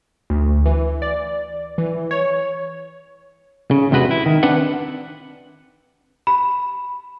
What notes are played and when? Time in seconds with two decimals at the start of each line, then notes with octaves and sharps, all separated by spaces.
0.30 D2
0.66 E3
1.02 D5
1.78 E3
2.11 C#5
3.71 C#3
3.91 E2 C3 G#3 F#4 B4
4.11 E4
4.26 D#3
4.43 C4 D4 B4 F#5
6.27 B5